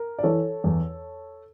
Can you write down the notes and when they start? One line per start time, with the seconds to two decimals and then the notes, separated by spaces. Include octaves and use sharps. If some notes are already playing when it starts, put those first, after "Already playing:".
Already playing: A#4
0.19 D5
0.23 E3 A4 C#5
0.64 E2